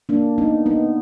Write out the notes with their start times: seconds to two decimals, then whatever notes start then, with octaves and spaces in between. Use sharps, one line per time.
0.09 A#3 D4
0.38 B3 D#4
0.66 B3 D#4